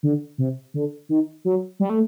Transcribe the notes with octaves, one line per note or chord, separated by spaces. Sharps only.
D3
C3
D3
D#3
F#3
G3
A3